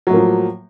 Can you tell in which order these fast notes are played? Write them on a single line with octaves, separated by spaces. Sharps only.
F#3 A2 A#3 F3